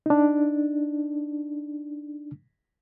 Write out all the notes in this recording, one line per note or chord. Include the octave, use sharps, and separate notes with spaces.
D4 D#4